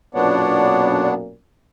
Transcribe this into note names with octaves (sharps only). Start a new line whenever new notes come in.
B1 F#2 A#2 B3 D4 C#5 D5 F#5